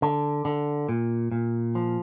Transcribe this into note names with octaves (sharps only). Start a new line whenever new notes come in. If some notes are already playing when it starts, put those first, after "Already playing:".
D3
D3
A#2
A#2
F3